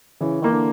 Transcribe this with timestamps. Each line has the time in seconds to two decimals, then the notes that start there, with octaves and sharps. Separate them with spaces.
0.21 C#3 E3
0.42 D#3 A#3
0.52 D3